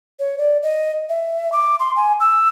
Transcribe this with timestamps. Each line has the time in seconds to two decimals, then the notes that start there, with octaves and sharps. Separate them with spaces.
0.19 C#5
0.38 D5
0.63 D#5
1.09 E5
1.52 D6
1.80 C6
1.96 G#5
2.20 E6